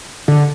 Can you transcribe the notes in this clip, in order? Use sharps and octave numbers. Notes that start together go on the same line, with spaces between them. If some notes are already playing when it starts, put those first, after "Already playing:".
D3